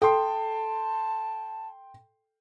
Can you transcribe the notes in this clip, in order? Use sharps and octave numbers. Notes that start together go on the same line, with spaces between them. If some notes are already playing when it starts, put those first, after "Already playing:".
A4 G5 A5 C6